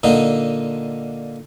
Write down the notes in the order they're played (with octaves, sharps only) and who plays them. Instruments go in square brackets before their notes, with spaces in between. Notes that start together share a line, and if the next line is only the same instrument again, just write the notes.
[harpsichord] A#2 D3 D#4